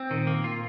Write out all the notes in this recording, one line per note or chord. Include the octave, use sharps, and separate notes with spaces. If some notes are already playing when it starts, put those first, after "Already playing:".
Already playing: C4
A#2 D#3
A#3
F4